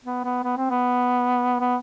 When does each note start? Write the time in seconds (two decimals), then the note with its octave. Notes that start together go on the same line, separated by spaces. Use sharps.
0.05 B3
0.25 B3
0.44 B3
0.57 C4
0.70 B3
1.60 B3